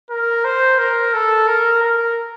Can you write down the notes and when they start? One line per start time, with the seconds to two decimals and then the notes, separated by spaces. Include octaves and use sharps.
0.10 A#4
0.44 C5
0.79 A#4
1.14 A4
1.48 A#4
1.82 A#4